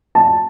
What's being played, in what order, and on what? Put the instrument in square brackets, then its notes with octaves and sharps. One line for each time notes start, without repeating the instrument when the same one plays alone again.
[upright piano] A5